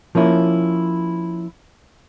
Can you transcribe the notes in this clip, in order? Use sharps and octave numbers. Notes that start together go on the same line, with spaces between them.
F3 A#3 C#4 E4